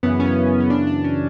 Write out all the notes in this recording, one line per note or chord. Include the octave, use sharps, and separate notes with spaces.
F#2 C#3 E3 B3
C#4
C#4
F#2 C#3 E3 D4
D4
C#4